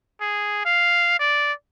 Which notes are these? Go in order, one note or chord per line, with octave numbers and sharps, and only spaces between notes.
G#4
F5
D5